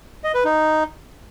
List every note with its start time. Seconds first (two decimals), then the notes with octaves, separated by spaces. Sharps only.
0.24 D#5
0.34 B4
0.45 D#4